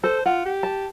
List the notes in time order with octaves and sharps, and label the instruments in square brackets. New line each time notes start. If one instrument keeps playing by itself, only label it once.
[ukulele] A4 [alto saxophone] C5
[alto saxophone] F4 [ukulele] F#5
[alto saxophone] G4
[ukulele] A5